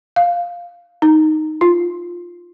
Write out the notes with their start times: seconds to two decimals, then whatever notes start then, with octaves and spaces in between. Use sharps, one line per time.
0.16 F5
1.02 D#4
1.61 F4